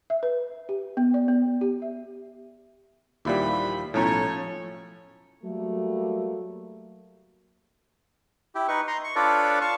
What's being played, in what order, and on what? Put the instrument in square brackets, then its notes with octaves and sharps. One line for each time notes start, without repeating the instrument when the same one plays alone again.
[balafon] E5
B4
G4
B3
D5
B3
G4
E5
[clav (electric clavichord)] D#2 A#2 G3 [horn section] E3 F3 B5 [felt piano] E4
[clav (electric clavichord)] B1 A2 [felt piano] F3 C#4 A#5 [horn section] A3 C#5
[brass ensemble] F#3 G3 A3 A#3
[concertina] E4 G4
D#4 B4 C#6
A#5 C6
C#6
D4 F4 A4 B4 C#5 D5
F5 A5 C#6